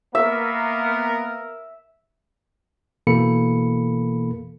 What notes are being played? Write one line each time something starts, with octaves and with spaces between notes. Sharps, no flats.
A#3 B3 A#4 E5
B2 E3 A#3 A4 B5 C#7